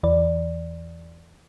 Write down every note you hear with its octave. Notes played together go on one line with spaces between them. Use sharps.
E2 E3 D5